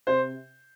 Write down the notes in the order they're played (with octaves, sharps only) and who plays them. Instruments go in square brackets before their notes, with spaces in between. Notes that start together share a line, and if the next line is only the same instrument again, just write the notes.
[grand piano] C3 C5